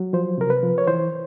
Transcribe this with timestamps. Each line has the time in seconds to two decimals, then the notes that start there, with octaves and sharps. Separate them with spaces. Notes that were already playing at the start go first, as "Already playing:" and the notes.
Already playing: F#3
0.13 F3 C5
0.38 C3 A#4
0.50 B4
0.63 F3
0.78 C#5
0.88 E3 C5